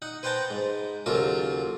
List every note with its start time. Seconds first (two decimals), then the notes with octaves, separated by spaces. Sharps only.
0.02 D#4 F#5
0.23 B4 C5 F#5 G5 A5 A#5
0.51 G#2
1.06 D#2 C#3 F#3 F4 A4 A#4